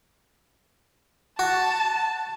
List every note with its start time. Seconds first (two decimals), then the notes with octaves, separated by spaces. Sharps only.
1.39 F#4 A5